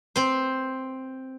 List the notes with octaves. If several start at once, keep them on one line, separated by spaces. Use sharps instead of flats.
C4 C5